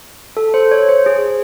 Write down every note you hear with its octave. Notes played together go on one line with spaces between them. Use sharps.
A4
C5
C#5
C5
G#4